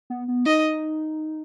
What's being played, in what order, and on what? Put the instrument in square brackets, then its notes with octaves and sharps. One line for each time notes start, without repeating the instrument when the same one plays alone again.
[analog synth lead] B3
B3
[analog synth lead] D#4 [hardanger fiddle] D#5